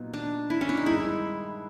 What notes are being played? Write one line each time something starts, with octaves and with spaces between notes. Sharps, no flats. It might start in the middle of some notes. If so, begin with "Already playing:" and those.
Already playing: A#2 F#3 B3 D#4
D4
E4
C#4
D4
D#4
G2 D#3 G#3 E4